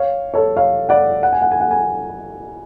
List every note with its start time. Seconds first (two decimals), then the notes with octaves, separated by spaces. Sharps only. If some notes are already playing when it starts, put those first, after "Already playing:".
Already playing: C#5 F5
0.34 A4 C#5
0.56 C#5 F5
0.89 D5 F#5
1.23 F#5
1.32 G#5
1.42 F#5
1.51 G#5
1.61 F#5
1.71 G#5